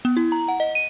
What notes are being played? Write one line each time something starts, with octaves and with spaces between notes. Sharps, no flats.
B3
E4
A#5
F#5
D#5
D#7